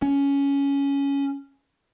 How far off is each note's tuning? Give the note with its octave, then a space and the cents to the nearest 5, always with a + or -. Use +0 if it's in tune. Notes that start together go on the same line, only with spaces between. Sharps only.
C#4 +10